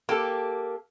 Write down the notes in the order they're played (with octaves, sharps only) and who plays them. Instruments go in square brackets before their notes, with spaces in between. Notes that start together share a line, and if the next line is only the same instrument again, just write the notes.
[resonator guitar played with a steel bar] A#3 G4 A4